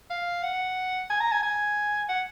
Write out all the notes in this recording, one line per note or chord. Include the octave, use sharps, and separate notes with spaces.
F5
F#5
G#5
A#5
G#5
G#5
F#5